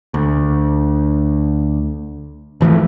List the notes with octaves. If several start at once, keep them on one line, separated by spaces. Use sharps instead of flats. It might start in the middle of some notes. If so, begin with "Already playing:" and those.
D2
G#1 E3 F3 A3